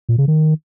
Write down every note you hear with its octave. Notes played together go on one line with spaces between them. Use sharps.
A#2
C#3
D#3